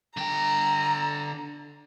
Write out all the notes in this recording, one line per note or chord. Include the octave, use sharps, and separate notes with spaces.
D3 G5 A#5